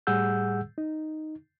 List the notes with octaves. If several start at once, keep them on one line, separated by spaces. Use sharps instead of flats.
A2 G3 G#4 F#5 E6 G6
D#4